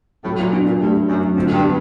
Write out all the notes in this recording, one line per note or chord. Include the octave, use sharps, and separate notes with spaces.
A2 F#3
A#2
B2 D4
A#2
G2 A3
F#2 F#3
F2 D3
G2
B3